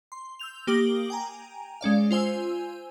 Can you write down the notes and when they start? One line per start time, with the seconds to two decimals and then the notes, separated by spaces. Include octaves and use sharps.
0.12 C6
0.39 E6 G6 F7
0.67 A#3 G4 D6 D#6 A#6 F#7
1.10 G5 G#5 A#5
1.81 G#3 C#4 D5 F5
2.11 F4 C5 G#5 E6